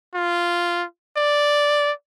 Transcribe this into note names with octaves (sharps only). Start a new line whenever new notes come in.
F4
D5